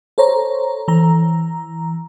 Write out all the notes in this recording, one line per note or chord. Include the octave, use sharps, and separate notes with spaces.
A4 C5 C#5 A#5
E3 A#5